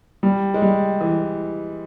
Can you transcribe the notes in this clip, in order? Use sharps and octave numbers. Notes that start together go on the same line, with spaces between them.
G3
G#3
G3
E3